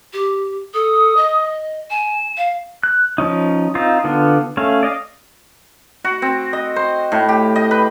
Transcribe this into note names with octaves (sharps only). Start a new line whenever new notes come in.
G4
A4 D#6
D#5
G#5 E7
F5
F#6
F3 C#4 D#4
C4 D#4 F4
D3 B3 F4
A3 C#4 F5
D5 D#5 F5
F#4
C4
D#5
C5
A2
G4
D#5
B4